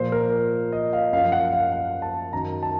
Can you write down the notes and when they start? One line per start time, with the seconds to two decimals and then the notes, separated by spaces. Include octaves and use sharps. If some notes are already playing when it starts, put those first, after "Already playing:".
Already playing: A#2 F3 C5
0.12 A#4
0.72 D#5
0.93 F5
1.13 F#2 F3 F5
1.32 F#5
1.52 F5
1.72 F#5
2.02 A5
2.32 F#2 D#3 F#3 A#5
2.63 A5